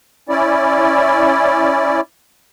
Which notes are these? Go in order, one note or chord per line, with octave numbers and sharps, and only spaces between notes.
C#4 E4 D5